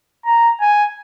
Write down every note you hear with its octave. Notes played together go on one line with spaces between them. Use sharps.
A#5
G#5